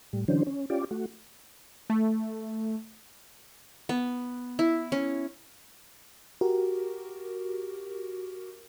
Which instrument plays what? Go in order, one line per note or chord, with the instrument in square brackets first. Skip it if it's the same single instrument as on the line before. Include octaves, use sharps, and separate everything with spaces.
[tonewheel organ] A2 G3
D3 E3 F#3 C#4 D4 C5
C#4
C#4 F4 G4 D5
A3 F#4
[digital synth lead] A3
[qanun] B3
E4
C#4
[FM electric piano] F#4 G4 A#4